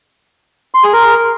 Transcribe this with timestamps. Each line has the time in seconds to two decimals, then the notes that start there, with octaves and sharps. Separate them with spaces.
0.74 C6
0.84 G#4
0.93 A#4